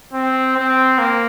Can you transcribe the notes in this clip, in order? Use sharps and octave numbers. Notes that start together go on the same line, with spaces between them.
C4
C4
A#3